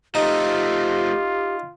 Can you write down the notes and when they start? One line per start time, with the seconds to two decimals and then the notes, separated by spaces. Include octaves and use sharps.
0.15 F3 A3 D#4 F4 G4